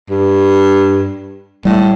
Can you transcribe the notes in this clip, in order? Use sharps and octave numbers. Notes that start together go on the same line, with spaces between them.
G2
A2 G3